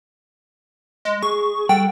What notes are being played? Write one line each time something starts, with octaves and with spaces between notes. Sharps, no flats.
G#3
G#4 C#6
G3 A4 F#5 G5